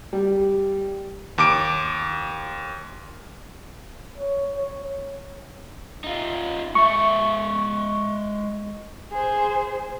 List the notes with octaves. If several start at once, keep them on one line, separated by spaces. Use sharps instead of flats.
G3
D#2 D6 D7
C#5
C#5
D#4 F4
G#3 E5 C#6
G#4 C5